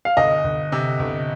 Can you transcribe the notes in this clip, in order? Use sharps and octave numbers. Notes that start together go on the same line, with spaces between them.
F5
G1 D#5
G1
C3
G1